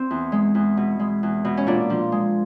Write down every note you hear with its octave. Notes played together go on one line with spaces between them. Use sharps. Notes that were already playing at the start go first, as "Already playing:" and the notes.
Already playing: C4
E2
G#3
E2
B2
G#3
E2
B2
C#4
A#2 D4
F3
G#3